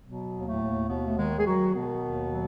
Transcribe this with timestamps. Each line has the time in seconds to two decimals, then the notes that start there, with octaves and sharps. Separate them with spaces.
0.04 B2 F#3 B3
0.33 D#2
0.46 A2 A3
0.61 D#2
0.89 D#2 B2 B3
1.05 A3
1.17 D#3 G#3
1.38 G#4
1.45 D#3 F#3 F#4
1.74 B2 D#3 B3
2.02 D#2
2.30 F#3